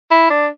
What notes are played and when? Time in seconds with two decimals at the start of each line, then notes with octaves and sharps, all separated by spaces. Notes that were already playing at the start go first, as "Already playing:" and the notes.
0.11 E4
0.30 D4